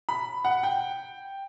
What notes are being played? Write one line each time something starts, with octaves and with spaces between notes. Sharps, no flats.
B5
F#5
G5